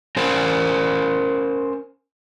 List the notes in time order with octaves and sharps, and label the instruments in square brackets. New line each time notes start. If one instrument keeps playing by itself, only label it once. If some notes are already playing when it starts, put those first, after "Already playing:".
[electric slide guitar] C#4 A#4 C5